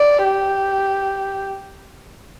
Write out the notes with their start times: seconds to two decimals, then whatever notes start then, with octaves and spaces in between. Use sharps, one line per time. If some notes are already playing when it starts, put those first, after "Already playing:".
Already playing: D5
0.24 G4